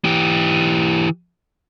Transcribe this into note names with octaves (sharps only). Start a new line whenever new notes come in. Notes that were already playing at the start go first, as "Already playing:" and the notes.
E3 G4